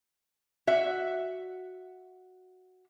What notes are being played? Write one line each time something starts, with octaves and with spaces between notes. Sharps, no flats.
F#4 E5